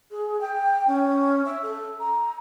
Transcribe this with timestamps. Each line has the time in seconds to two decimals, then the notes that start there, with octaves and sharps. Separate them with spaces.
0.11 G#4
0.41 G5
0.87 C#4
1.45 E5
1.62 A4
2.00 A#5